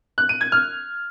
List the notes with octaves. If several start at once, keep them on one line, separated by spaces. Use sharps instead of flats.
F#6
D#7
G#6
F6